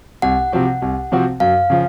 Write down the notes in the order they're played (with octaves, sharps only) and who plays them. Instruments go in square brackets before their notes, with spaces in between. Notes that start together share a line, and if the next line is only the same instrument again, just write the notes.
[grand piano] C2 [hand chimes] F#5
[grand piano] C3 F3 C4 F#4
C2
C3 F3 C4 F#4
[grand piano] F#2 [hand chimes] F5
[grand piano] C#3 F3